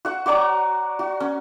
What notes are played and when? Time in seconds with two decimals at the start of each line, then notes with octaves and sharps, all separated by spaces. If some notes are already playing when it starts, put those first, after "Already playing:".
0.05 F#4 F#5
0.26 F#4 C#5 D5 A#5
0.99 F#4
1.20 C#4